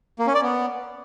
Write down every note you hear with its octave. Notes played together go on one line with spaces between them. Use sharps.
A#3
C#4
D5
B3